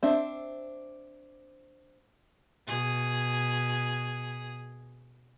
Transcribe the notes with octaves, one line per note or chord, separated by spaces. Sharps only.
C4 D4 E5
B2 G#4